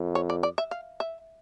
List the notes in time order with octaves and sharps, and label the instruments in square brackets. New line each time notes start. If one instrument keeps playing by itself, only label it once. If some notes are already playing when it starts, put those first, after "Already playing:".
Already playing: [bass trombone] F2
[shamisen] C#5
D5
D5
E5
F5
E5